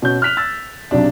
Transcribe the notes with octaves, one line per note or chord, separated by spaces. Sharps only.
B2 C#4 G6
F6 F#6 B6 F7
E6 A6
B1 C3 D4